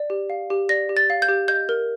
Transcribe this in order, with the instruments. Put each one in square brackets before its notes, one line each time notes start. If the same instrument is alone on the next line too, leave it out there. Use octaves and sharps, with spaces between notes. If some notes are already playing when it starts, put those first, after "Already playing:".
Already playing: [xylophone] D5
G4
F5
G4
D5 A#6
G4
A6
F5
G6
G4
D#5 G6
A#4